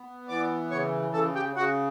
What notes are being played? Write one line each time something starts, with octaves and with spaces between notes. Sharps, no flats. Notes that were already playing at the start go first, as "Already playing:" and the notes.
Already playing: B3
E3 D5 D6
C#3 C#5 C#6
C#3 A4 A5
G4 G5
C#3 F#4 F#5